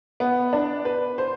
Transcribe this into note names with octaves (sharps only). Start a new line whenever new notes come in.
B3
D4
B4
C5